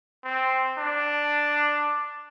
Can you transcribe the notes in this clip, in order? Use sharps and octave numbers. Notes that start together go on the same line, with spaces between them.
C4
D4